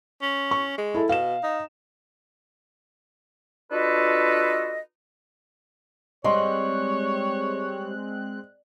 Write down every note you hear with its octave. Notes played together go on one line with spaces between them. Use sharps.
C#4
C#6
G#3
E4 A4
B2 F5 E7
D#4
D4 F4 F#4 A4 B4 D#5
G3 G#3 C4 C#5 D#5 C6 F#6